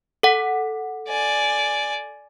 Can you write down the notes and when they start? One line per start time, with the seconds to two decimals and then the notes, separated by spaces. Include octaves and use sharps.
0.23 A4 F#5
1.09 D5 G#5